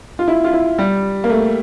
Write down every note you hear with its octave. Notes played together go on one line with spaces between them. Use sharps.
F4
E4
F4
E4
G3
A#3
A3